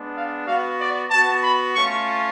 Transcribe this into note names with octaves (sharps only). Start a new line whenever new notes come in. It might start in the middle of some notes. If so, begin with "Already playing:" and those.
Already playing: G#3 B3 D4
F5
B3 F#4 F5
D5
B3 F#4 A5
B5
A3 C#4 F4 C#6